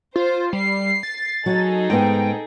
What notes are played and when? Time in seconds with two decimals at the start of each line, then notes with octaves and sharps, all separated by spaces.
0.16 F4 C5
0.53 G3 C7
1.03 A6
1.46 F#3 D#4 G#4 A4
1.90 G#2 B3 G5